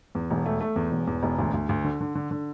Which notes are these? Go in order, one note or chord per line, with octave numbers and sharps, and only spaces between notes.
E2
E1
A3
A3
E2
E1
E2
E1
D2
D2
D2
D3
D3
D3
D3